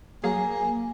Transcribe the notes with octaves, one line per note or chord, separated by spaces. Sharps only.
F#3 A#3 G#4 F5 G#5